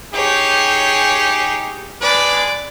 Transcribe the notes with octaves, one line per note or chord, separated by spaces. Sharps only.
D#4 G4 G#4 C#5
G#3 D4 B4 D5